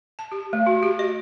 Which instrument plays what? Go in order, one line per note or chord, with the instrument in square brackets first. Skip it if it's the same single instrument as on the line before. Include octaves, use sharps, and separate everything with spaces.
[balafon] A5
G4
A3
F#4
G4
D#5